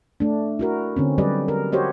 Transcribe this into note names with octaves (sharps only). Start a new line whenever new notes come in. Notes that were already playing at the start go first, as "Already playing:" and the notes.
A3 D4
E4 F#4 A#4
D3 C4 C#4
F#3 G3 G4 B4 D5 D#5
A#4
F#4 G4 C5 C#5 D#5